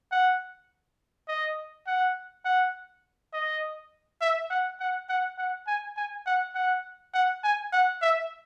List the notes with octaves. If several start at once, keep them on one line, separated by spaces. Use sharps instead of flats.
F#5
D#5
F#5
F#5
D#5
E5
F#5
F#5
F#5
F#5
G#5
G#5
F#5
F#5
F#5
G#5
F#5
E5